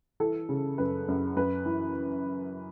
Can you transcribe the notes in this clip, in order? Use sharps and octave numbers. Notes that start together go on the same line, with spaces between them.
E3 A4
C#3
F#2 B4
F#2
F#2 B4
E3